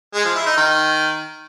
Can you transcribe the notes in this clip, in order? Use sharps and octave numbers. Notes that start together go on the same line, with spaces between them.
G#3
F3
E4
D#4
D#3